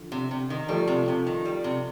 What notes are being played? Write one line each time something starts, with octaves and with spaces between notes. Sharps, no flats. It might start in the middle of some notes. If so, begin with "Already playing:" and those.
Already playing: D3 F3
C3
C3
D#3
F3 G3 A3
C3
C3
D#3
G3
C3